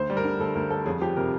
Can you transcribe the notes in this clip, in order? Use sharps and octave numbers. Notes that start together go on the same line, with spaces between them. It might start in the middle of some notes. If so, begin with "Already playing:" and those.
Already playing: D2 C5
G3
A#4
D3
D2 A4
D2 A#4
G3 A4
F2 G#4
F3 G4
C3 A#4